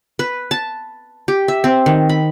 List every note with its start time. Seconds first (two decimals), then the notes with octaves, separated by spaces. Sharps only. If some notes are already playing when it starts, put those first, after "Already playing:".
0.19 B4
0.51 A5
1.28 G4
1.48 E5
1.64 C4
1.86 D#3
2.09 B5